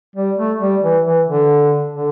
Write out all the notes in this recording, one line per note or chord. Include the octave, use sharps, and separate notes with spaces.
G3
A3
G3
E3
E3
D3
D3